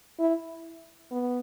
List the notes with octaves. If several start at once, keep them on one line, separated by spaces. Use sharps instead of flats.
E4
B3